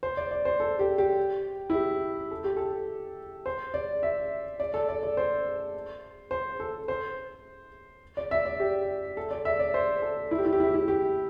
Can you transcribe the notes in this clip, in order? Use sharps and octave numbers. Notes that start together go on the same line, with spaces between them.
C5
D5
D5
C5
A4
G4
G4
E4
G4
A4
G4
A4
C5
D5
E5
D5
A4
D5
D5
C5
C5
A4
C5
D5
E5
D5
G4
A4
D5
E5
D5
C5
A4
E4
G4
E4
G4
E4
G4
E4
G4